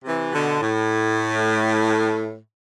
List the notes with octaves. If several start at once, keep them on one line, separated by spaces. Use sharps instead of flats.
C3 E3
B2 D3
A2